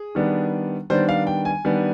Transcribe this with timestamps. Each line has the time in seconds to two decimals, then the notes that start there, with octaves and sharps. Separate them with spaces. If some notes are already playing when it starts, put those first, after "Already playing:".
Already playing: G#4
0.15 D#3 G3 B3 D4
0.90 D#3 G3 B3 D4 C5
1.09 F5
1.27 G5
1.45 G#5
1.64 D#3 G3 B3 D4